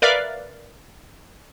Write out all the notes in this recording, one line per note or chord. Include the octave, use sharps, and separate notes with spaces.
A#4 B4 D5 E5 F5